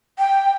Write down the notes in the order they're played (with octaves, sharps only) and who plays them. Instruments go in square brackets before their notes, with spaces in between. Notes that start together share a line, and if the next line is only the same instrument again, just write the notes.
[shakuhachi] G5